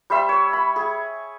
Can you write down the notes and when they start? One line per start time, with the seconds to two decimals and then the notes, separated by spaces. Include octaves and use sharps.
0.10 G3 C5 E5 C6
0.29 C#5
0.53 B5
0.76 G#4